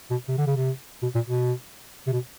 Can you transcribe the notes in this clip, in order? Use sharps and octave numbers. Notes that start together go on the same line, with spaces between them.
B2
C3
D3
C#3
C3
B2
A#2
B2
C3
B2